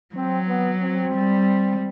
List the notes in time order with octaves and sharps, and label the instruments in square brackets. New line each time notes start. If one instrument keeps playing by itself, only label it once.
[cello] F#3 [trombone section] C4
[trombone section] B3
C4
[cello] G3